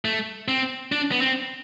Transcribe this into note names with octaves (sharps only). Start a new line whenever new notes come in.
A3
C4
D4
B3
C4